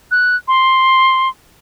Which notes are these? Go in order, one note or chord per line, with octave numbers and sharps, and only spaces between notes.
F#6
C6